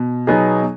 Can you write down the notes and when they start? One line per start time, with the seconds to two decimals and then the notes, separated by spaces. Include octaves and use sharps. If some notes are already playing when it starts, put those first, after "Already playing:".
Already playing: B2
0.27 B2 F#3 B3 D#4 G#4